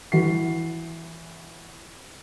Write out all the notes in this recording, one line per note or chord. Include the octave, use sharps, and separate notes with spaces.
E3 F#4 C7